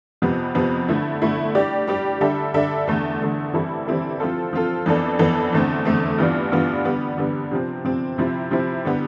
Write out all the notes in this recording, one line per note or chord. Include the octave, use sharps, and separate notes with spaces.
F2 C3 F3 B3
F2 C3 F3 B3
D3 A3 E4
D3 A3 E4
G3 D4 G4 D5
G3 D4 G4 D5
D3 G3 D4 A4 E5
D3 G3 D4 A4 E5
E2 D3 A3
E2 D3 A3
E3 G3 C4 E4 A4
E3 G3 C4 E4 A4
F3 C4 F4 A4
F3 C4 F4 A4
F2 E3 B3 D4 A4
F2 E3 B3 D4 A4
E2 D3 A3 C4
E2 D3 A3 C4
G2 E3 B3 D4 F4
G2 E3 B3 D4 F4
D3 G3 B3
D3 G3 B3
C3 F3 C4
C3 F3 C4
C3 F3 C4 E4
C3 F3 C4 E4
D3 G3 B3